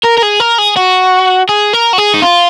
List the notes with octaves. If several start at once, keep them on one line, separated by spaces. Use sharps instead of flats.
A#4
A#4
G#4
A#4
G#4
F#4
G#4
A#4
F#4
G#4
D#4
F4